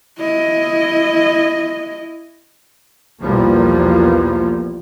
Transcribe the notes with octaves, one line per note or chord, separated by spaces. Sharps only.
E4 D#5
B1 E2 B2 F3 G3 A#3